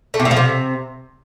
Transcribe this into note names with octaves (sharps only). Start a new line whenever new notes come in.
A3
C3
A2
F3
C3